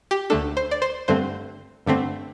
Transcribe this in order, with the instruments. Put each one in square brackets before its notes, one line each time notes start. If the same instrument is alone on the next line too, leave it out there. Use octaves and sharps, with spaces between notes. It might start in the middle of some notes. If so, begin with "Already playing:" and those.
[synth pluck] G4
D2 D3 A3 D4 A4
C5
D5
C5
G2 D3 A3 C4 C5
G2 D3 A3 C4